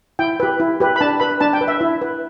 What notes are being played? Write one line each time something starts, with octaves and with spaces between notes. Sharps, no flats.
E4 G5
G4 B4
E4
G4 B4
B5
D4 A5
B4 B5
D4 A5
G5
B4
E5
E4
B4